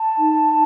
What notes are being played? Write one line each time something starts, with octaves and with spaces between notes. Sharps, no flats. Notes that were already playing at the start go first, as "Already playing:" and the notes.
Already playing: A5
D#4